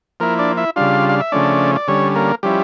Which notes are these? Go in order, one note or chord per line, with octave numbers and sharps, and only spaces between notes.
F3 A#3 E4 A#4
D4 D5
E4 E5
C#3 G3 D4 F4 F5
F5
E5
C#3 F3 A3 C#4 D4 D5
D5
D3 G3 C#4 C#5
A#3 A#4
F3 G3 C#4 E4 G4